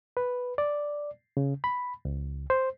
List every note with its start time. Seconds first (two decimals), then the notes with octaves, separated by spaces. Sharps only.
0.17 B4
0.58 D5
1.37 C#3
1.64 B5
2.05 C#2
2.50 C5